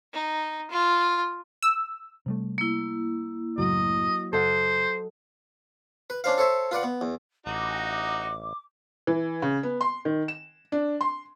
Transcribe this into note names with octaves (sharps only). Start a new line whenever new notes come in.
D#4
F4
E6
C3 G3 A3
A#3 E4
F#1 C#2 A2 F#3 D#5
F#1 A4 C5 D#5 F#5
B4
C#4 D4 C5 F5
A4 C5 C#5 E5
F4 B4 D5 F#5
B3
E2
A1 D#4 F#4 D6
E3
C#3
B3
C6
D#3
E7
D4
C6